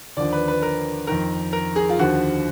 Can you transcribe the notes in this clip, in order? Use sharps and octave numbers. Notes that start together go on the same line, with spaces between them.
D#2 D3 F3 D5
B4
B4
A#4
F2 D#3 A#4
A#4
G#4
F4
D#2 D3 F3 F#4